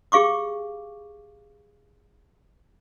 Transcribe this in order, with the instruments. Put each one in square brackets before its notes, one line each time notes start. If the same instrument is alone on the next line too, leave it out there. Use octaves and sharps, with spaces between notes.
[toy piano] G4 G#4 F5 C#6 D6